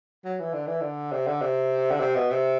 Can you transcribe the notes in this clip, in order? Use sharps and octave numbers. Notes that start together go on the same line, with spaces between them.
F#3
E3
D3
E3
D3
C3
D3
C3
D3
C3
B2
C3